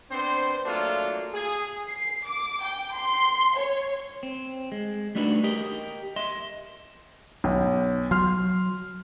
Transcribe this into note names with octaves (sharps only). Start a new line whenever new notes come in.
B3 C4 D4 C5
F#3 A3 A#3 D4 F4
G#4
C7
D6
G5
C6
C#5
C4
G#3
G3 A3 D4 D#4 F#4 B4
G4 A#4 D#5
D#5 E5 C6
B1
F#3 C6 F6